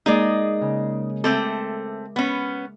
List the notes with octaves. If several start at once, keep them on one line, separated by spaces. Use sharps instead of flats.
G#3 A#3 D#4 G#4 D5 D#5
C#3
A3 C4 A4 E5 D6
B3 C#4